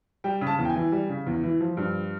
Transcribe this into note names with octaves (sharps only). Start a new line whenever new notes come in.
G3 G5
C#3
A5
E2
G5
G#5
E3
G3
C#3
E2
E3
F3
G2